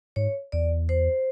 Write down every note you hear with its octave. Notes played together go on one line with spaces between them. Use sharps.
G#2 C#5
E2 D5
C5